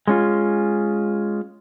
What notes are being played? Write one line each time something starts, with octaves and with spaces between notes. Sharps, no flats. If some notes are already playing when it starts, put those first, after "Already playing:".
G#3 C#4 F4